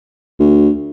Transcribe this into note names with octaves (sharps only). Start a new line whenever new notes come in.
D2